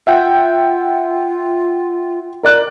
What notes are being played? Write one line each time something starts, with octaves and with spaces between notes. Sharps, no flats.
F4 E5 F#5 G5
A#4 D5 F#6